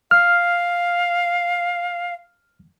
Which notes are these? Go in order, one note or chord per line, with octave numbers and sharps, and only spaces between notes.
F5 F6